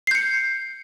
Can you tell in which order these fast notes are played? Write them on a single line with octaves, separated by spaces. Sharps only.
C7 G6 C#7